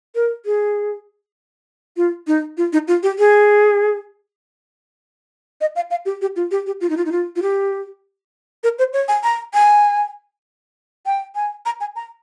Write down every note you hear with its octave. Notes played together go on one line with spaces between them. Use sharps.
A#4
G#4
F4
D#4
F4
D#4
F4
G4
G#4
D#5
F5
F5
G4
G4
F4
G4
G4
F4
D#4
F4
D#4
F4
F4
G4
A#4
C5
C#5
G#5
A#5
G#5
G5
G#5
A#5
G#5
A#5